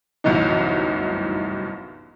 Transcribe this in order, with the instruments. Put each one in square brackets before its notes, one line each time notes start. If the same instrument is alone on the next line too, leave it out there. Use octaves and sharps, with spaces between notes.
[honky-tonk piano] G1 C2 F#2 A2 E3 D#4